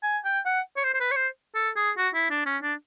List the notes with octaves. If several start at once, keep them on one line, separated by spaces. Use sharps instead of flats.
G#5
G5
F#5
C#5
C5
C5
B4
C#5
C5
A4
G#4
F#4
E4
D4
C#4
D4